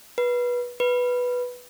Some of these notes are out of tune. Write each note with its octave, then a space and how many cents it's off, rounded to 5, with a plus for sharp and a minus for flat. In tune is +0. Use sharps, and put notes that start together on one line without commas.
B4 -20
B4 -5